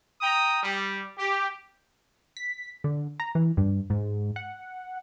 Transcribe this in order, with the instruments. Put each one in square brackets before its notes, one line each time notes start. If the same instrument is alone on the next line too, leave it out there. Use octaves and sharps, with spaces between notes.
[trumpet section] G5 A#5 D#6
G3
G4
[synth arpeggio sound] B6
D3
A#5
E3
G2
G#2
F#5